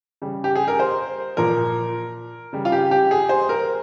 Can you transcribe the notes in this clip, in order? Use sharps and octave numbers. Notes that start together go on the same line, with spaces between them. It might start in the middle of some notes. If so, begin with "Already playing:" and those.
C#3 G3
G4
G#4
A#4
C5
A#2 F3 A#4
C#3 G3
F4
G4
G4
G#4
C5
A#4